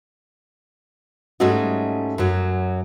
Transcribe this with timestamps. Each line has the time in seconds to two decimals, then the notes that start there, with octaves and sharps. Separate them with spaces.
1.40 G#2 G3 A3 C#4 F#4 D#5
2.18 F#2 F#3